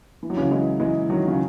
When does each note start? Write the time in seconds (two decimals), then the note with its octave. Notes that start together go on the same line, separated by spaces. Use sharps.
0.23 E3
0.30 F#3
0.37 C#3 E3
0.51 E3 G#3
0.80 E3 G#3
1.09 D#3 F#3
1.28 C#3